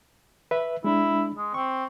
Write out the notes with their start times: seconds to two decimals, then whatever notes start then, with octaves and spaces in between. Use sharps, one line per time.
0.51 B4 E5
0.84 G#3 D4 E4
1.37 G#3
1.54 C4 C#6